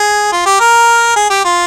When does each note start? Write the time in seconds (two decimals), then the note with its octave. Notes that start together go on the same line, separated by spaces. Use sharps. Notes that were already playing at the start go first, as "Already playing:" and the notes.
Already playing: G#4
0.32 F4
0.46 G4
0.60 A#4
1.16 G#4
1.30 G4
1.45 F4